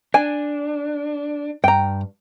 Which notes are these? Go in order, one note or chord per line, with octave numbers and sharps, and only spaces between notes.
D4 G#5
G2 G5 A#5